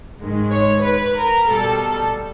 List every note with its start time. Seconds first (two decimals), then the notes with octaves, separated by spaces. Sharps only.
0.19 G#2 D#3 G#3
0.52 C#5
0.84 B4
1.17 A#4
1.49 B2 G3 A4